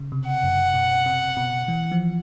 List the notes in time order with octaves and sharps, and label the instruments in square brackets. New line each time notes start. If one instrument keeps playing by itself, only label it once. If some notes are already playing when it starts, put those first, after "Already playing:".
Already playing: [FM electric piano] C#3
C3
[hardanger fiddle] F#5
[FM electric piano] F#2
B2
C3
B2
E3
F3